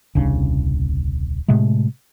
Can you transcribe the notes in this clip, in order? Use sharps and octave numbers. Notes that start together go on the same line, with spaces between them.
D#1 C2 C#3 D4
A2 C3 G#3 A3